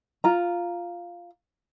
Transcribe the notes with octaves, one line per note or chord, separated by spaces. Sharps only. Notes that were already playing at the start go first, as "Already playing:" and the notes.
F4 A#5